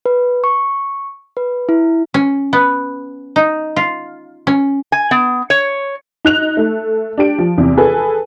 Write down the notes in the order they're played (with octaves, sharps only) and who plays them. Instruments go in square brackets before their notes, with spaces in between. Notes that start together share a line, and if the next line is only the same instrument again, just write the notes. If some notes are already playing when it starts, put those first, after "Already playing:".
[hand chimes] B4
C#6
B4
E4
[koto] C#4
B3
D#4
F4
C#4
[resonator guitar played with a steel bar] G#5
B3
C#5
[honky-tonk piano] D#4 F#6 F7
A3
D4 G4 D7
F3
E2 C3
G#4 A4 B4 G#5